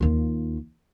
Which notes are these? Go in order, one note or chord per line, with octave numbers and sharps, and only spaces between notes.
D#2 F4